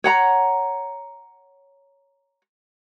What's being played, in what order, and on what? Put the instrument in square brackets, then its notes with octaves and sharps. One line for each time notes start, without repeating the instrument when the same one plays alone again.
[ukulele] C#5 F#5 A#5